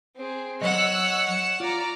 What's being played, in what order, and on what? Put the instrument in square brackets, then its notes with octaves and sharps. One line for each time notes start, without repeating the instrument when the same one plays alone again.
[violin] C4 G#4
[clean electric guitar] F#3 D#5 [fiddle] C#5 F#5 [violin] E6 F#6
[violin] C#7 E7
[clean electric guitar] F4 [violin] D5 A#5